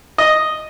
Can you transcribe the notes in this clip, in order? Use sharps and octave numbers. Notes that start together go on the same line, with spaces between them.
D#5